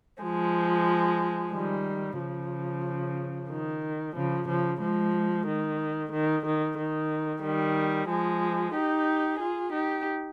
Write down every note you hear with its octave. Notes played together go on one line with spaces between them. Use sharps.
F3 G#3
D#3 G3
C#3 F3
D#3
C#3 F3
C#3 F3
F3 G#3
D#3
D#3
D#3
D#3
D#3 G3
F3 G#3
D#4 G4
F4 G#4
D#4 G4